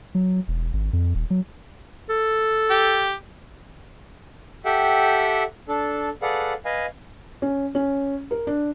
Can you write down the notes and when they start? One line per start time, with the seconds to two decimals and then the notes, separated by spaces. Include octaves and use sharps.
0.15 F#3
0.48 E1
0.73 G#1
0.93 F2
1.15 D#1
1.30 F#3
2.10 A4
2.71 G4
4.65 G4 A4 E5 F#5 G5
5.68 D4 A4
6.22 G#4 A4 B4 D5 F5 F#5
6.65 B4 D#5 F5 G#5
7.42 C#4
7.75 C#4
8.31 A#4
8.47 D4